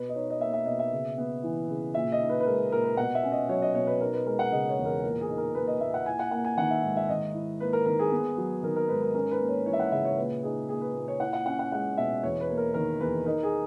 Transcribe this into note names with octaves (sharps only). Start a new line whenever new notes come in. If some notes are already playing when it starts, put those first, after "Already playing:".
Already playing: B2 B4
D#5
D#4 C#5
D#5
A#3 E5
E5
B2 D#5
E5
C#3
B3
E3
C#3
A#2 E5
D#5
D#4
B4
B4
G#3 A#4
A#2 A#4
B4
B2 F#5
E5
C#4
D#5
F#3 C#5
D#5
B2 C#5
B4
D#4 A#4
B4
G#3 A#4
F#5
C#3 D#5
C#5
E2
A#4
A#2 A#4
G#4
D#4
A#4
A#3 B4
D#5
A#2 E5
F#5
E4 G#5
F#5
A#3 F#5
G#5
D#3 F#5
E5
G#2
E5
D#3 D#5
E4
A#3 B4
A#4
D#3 A#4
G#4
B3
F#3
D#3 A#4
A#4
G#2 B4
A#4
C#4 A#4
B4
A#3
C#5
E3 C#5
E5
F#5
C#3 E5
C#5
A#2 B4
D#4 G#4
A#3 G#4
B4
A#2
C#5
E4 F#5
F#5
C#4 F#5
F#5
G#3 F#5
B2 E5
E2 C#5
B4
A#3
A#4
D#3 A#4
E2 B4
D#4 A#4
G#4